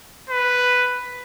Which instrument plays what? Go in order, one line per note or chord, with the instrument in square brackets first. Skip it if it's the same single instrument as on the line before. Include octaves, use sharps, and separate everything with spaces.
[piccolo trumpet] B4